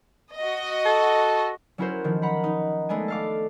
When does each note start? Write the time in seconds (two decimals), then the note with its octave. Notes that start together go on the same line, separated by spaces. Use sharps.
0.38 F#4 D#5
0.85 A4
1.78 F#3 C#4 E4 F#4 A#4 C5
2.04 D#3 F3
2.22 F#5 A#5 B5
2.44 D#4
2.89 G#3 A3 B3 D4 G#5
3.08 A4 F5 D6